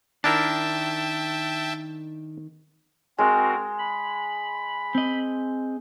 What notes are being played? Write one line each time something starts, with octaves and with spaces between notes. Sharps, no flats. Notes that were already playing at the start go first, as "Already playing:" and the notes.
D#3 D4 E4 A#4 E5 G5 A5
G#3 C4 F#4 A#4
B5
C4 D#5